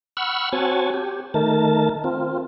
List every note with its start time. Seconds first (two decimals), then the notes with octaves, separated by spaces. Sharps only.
0.17 F#5 B5 C#6 E6 F6
0.53 C4 F#4 C#5 G#5 A5
0.94 G4
1.34 D#3 A3 A#4 A5
2.04 C4 F4